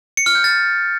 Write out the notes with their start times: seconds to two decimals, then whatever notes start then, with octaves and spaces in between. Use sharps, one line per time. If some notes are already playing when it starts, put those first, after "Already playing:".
0.17 C#7
0.26 F6
0.35 G6
0.44 A6